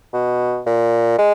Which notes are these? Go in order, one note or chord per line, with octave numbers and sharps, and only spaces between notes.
B2
A#2
G#3